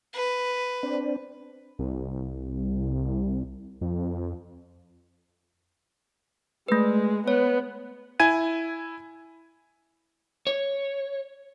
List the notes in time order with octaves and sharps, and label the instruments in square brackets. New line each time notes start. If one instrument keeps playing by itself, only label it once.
[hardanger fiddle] B4
[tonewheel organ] C4 D4
[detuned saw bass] C2
F2
[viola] G#3 [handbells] A3 B4
[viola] B3 [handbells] C#5
[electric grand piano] E4 G#5 G#6 D#7
[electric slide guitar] C#5